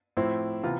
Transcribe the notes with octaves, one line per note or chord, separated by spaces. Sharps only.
A2 F3 C4 E4
C3 E3 B3 F4